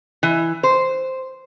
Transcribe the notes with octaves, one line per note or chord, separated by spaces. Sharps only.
E3
C5